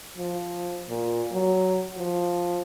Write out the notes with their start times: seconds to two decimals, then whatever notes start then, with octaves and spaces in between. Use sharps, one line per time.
0.17 F3
0.89 A#2
1.32 F#3
1.97 F3